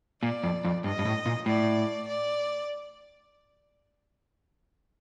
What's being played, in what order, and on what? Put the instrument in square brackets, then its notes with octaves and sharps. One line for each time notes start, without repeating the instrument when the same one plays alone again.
[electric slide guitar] A#2 [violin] D5
[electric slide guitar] F2
F2
[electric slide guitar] G2 [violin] D#5
[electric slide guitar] G2
A2
A#2
[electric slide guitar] A2 [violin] D5
[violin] D5